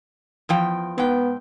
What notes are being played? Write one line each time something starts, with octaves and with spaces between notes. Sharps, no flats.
E2 F3 G5
G#2 B3 G5